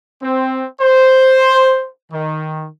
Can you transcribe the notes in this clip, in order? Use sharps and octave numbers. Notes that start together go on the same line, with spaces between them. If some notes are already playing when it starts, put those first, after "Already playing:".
C4
C5
D#3